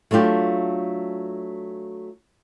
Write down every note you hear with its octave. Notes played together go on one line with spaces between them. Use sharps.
F#3 A3 D4 F4 G4